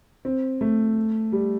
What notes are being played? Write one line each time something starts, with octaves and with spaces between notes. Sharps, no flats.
C4
A3
G3